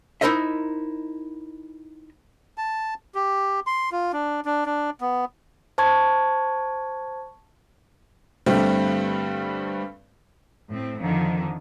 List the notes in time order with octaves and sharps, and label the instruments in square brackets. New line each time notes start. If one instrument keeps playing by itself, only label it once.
[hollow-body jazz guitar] D#4 E4 A#4 C5 D#5 E5
[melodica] A5
G4
C6
F4
D4
D4
D4
B3
[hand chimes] C5 A5 C#6 G#6
[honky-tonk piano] G2 D3 G3 A3 C4
[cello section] A2 C4
F2 D3 D#3 F3